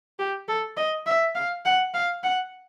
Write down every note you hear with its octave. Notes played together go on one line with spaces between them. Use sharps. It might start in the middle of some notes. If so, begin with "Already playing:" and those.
G4
A4
D#5
E5
F5
F#5
F5
F#5